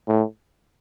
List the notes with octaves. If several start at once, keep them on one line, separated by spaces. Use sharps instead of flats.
A2